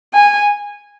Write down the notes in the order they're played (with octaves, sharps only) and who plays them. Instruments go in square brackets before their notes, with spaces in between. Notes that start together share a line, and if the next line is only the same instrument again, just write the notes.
[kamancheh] G#5